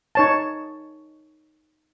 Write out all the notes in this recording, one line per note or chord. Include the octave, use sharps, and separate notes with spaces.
D#4 C#5 A5